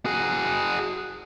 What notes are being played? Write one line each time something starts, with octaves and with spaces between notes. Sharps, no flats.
F#4 G#4